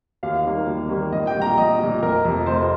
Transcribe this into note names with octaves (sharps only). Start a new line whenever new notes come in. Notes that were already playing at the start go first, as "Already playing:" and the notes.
D#2 F5
D#3 G3 A#3
D#2
D#3 G3 A#3
A#1 D#5
G5
A#2 G3
A#5
A#1 D#5
A#2 G3
F1 A#4
F2 C3
F1 C5